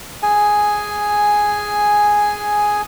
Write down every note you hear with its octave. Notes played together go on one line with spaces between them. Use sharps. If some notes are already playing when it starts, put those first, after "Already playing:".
G#4 G#5